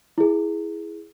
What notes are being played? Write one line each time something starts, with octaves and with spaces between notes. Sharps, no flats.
E4 G#4